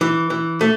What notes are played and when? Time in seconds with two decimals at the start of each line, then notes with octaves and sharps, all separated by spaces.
0.01 E3
0.30 E3
0.61 A3